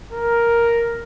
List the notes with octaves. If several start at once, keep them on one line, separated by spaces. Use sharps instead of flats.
A#4